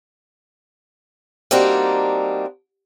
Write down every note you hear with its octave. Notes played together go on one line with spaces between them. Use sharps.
G3 A#3 C4 D4 D#4 F#4